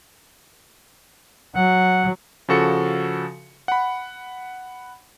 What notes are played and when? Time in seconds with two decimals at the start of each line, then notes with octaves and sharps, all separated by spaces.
1.56 F#3 F#5
2.49 C#3 F3 F#4 A4 C#7
3.68 F#5 B5